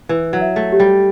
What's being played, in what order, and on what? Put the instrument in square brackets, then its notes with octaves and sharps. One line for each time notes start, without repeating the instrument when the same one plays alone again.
[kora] E3 [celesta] B4
[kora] F#3
[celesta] E5
[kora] A3
[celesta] G4
[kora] G3